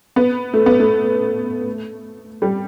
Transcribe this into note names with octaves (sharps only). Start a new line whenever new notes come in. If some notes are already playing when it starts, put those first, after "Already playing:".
B3
A3
B3
A3
G3